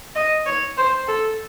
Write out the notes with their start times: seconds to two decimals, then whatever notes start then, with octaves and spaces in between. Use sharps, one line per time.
0.15 D#5
0.46 C#5
0.77 C5
1.08 A4